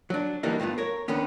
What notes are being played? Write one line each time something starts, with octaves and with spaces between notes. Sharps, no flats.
F#3 D4
D3 E3 F#3 G3 A#3 D#4
G2 A3 B3 F4
A#4 C#5
D2 D3 D#3 B3 C#4